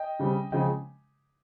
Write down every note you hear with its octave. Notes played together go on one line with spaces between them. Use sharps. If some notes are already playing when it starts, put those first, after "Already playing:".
Already playing: D#5 G5
C#3 G3 C4
C#3 F3 G#3 C4 D#5 G5